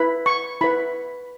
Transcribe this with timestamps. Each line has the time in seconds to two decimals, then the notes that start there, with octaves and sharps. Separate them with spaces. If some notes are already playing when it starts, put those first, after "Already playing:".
Already playing: E4 B4 B5
0.26 C#6
0.61 E4 B4 B5